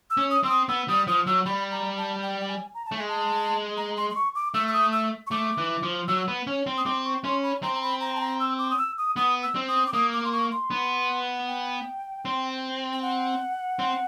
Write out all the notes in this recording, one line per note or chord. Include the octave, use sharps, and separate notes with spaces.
E6
C#4
D#6
C4 E6
D#6
B3 E6
G3 D#6
F3 D#6
F#3 E6
G3 B5
A#5
A5
G5
G5
G#5
A#5
A5
A3
G#3 G#5
A5
A#5
C6
C6
C#6
D6
A3 E6
E6
D#6
E6
C#6
A3 D6
E3
F3
F#3 E6
B3
C#4
C4
D#6
C4 D6
C#6
C#4 C6
B5
C4 A#5
A#5
B5
A#5
A5
A#5
E6
D6
D#6
E6
D#6
B3 D#6
E6
C4
D#6
D6
A#3 D#6
D6
C6
C#6
C6
B3
G5
C4
G5
F#5
C4